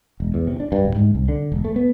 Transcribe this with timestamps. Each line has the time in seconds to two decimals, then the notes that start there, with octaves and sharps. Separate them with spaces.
0.20 E1
0.34 E2
0.47 C3
0.60 D4
0.72 G2
0.85 D1
0.96 G#2
1.15 C2
1.28 D3
1.52 E1
1.65 A3
1.76 B3